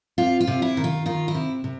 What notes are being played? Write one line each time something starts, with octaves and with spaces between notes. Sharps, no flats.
C3 F4
F4
C3
E4
D#3
F4
D#3 F4
E4
C3
C3